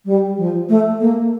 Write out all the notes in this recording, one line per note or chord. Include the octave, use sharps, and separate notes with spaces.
G3
F3
A3
A#3